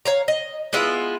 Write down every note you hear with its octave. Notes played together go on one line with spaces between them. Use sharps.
C#5 F5 A#5
D#5
G#3 B3 E4 F4